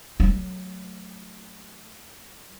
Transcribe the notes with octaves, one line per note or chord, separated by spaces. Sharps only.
F#3 A3